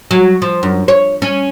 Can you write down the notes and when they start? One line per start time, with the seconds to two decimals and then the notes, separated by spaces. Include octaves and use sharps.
0.11 F#3
0.42 F3
0.63 F#2
0.88 C#5
1.22 C#4